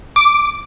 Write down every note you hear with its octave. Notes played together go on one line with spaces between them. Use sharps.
D6